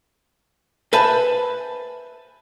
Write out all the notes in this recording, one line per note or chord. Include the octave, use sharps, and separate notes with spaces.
B4 C5 E5 G#5 A5 B5